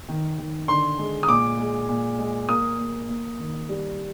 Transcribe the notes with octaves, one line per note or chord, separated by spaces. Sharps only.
D#3
D#3
D3 C6
G#3
D#6
A#2 D6
G#3
A#2
G#3
A#3 D#6
A#3
A#3
D#3
G3